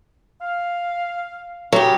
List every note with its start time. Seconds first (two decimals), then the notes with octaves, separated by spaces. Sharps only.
0.42 F5
1.72 C#3 F#3 G4